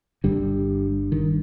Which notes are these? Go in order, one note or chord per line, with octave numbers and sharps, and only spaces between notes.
G1 G2 D3 G3
D#3